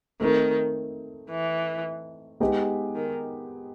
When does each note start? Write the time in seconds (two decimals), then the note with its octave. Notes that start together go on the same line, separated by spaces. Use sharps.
0.21 D#3 A3 C4 D#4
1.31 E3
2.40 G#3 B3 D#4 G4
2.96 D#3